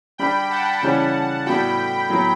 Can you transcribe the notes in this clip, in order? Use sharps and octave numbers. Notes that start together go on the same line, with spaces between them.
G3 D4 G4 G5 B5
F#5 A5
C#3 E3 G3 C#4
A2 G3 B3 F#4 G5 B5
A2 F#3 B3